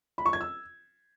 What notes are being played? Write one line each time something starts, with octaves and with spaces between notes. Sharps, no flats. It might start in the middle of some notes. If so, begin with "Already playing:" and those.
B5
C#6
G#6
E6